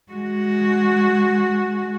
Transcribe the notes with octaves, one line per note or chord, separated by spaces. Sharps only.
G#3 F#4